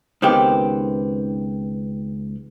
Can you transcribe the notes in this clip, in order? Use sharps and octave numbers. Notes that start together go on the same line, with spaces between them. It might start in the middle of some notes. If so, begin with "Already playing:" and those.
C#2 D#3 B3 C4 G4